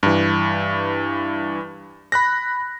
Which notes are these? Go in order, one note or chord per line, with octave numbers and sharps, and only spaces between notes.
G2 E3
B5 F#6 A#6